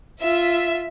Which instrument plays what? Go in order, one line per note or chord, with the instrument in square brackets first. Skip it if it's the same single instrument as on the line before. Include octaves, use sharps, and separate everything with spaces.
[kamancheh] F4 [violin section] E5